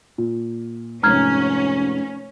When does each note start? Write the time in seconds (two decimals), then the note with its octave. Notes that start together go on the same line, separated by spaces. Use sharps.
0.18 A#2
1.03 F1 G#2 C#4 A#5 F6 G#6